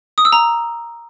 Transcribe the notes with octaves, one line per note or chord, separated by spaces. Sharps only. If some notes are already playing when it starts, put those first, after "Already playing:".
D#6
E6
A#5